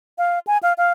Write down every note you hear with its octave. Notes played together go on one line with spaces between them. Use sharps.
F5
G#5
F5
F5